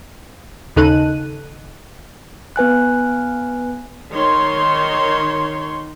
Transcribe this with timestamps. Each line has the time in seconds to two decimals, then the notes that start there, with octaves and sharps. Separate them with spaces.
0.76 D#2 C#3 D#4 A4 F#6 D#7
2.56 B3 B4 G#5 F#6
4.11 D#3 C#5 C6